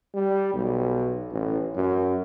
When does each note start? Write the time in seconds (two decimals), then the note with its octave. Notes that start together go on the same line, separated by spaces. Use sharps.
0.14 G3
0.54 B1
1.32 A1
1.75 F#2